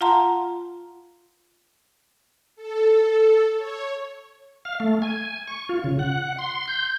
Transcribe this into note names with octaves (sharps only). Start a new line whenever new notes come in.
F4 F5 F#5 A5 A#5 C6
A4
C#5
F5
A3
G#5
C#6
F4
C#3
F#5
C6
G6